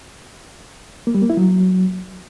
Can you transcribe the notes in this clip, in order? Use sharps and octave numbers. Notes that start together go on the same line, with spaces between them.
A#3
G3
A#3
E4
F#3